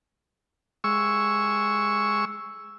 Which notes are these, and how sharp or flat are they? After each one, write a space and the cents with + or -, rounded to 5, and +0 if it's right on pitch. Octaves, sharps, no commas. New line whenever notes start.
G#3 +0 C#6 +0 E6 +0